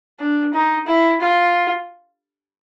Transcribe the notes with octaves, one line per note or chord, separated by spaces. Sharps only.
D4
D#4
E4
F4